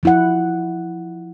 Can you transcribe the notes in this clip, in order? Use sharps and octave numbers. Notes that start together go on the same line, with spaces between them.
F3 E4 F#5